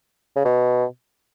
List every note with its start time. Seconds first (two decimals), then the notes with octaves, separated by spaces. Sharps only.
0.36 C#3
0.45 B2